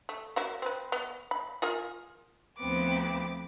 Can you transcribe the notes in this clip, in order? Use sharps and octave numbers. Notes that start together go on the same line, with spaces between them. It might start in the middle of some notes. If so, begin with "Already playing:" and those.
A3
F#3 A#3 E4
C4 B4
B3
B5
F4 G#4 A#4
D2 F3 B3 C4 D6